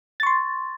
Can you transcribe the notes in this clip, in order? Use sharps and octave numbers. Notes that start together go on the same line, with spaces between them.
C6 C#6 A6